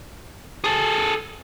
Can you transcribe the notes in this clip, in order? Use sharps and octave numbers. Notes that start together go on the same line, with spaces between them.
G#4 A4